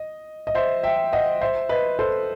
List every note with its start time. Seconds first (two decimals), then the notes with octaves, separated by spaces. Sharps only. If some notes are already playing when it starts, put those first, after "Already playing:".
Already playing: D#5
0.47 D#5
0.55 C5 E5
0.83 E5 G5
1.12 D#5 F#5
1.41 C5 E5
1.69 B4 D#5
1.99 A4 C5